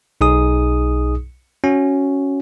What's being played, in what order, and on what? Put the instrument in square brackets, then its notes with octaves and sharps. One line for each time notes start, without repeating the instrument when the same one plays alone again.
[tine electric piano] B1 D#4 G#4 D#6
C#4 F#4